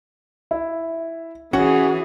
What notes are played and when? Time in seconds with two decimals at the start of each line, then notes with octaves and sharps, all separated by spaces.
0.51 E4
1.53 E3 C#4 F#4 G#4 C#5 F#5